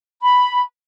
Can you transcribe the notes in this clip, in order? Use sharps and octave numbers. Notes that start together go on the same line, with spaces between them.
B5